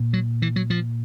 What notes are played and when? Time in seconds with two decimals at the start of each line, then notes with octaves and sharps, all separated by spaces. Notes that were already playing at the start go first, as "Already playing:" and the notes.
Already playing: A#2
0.13 F#3
0.42 E3
0.56 F#3
0.70 F3